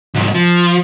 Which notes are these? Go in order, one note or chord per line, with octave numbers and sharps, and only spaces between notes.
C2 G#2
F3